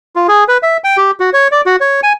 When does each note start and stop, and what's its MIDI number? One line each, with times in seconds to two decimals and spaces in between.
0.16 0.27 65
0.28 0.44 68
0.48 0.58 71
0.63 0.77 76
0.84 0.97 79
0.97 1.11 67
1.20 1.30 66
1.33 1.48 73
1.52 1.61 74
1.66 1.76 66
1.80 2.01 73
2.03 2.13 80